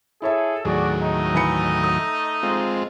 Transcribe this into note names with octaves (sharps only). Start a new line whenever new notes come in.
E4 G#4 A4 C#5 E5
D#2 A2 F#3 F#4 G#4 D5
A3 D#4 D#5
E3 B5 C#7
D#6
G#3 C4 F4